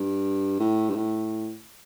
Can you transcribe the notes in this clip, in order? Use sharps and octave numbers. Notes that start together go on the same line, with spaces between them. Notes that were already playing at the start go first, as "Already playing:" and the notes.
Already playing: G2
A2
G2
A2